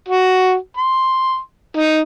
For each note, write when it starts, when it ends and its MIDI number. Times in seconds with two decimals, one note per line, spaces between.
0.08 0.54 66
0.77 1.38 84
1.77 1.98 63